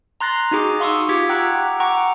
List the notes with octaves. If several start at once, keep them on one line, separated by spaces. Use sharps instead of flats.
A#5 C6 F#6 A6 A#6 C7
D#4 F#4 G#4 D6
F5 C6 C#6 D#6 E6
F4 G4 D6 G#6 B6
F#5 G5 A#5 E6 F#6 G#6
F#5 G5 A#5 C#6 D6